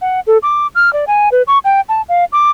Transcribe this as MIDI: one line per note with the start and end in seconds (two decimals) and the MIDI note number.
0.02 0.20 78
0.27 0.38 69
0.43 0.67 86
0.75 0.92 89
0.93 1.05 74
1.07 1.29 80
1.32 1.42 71
1.47 1.58 85
1.65 1.81 79
1.89 2.02 81
2.09 2.25 77
2.32 2.51 86